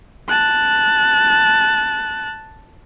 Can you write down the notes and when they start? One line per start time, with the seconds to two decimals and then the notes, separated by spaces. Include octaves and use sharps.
0.29 A5 F#6